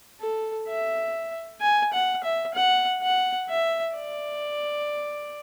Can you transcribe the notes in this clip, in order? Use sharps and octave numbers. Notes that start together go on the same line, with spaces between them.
A4
E5
G#5
F#5
E5
F#5
F#5
E5
D5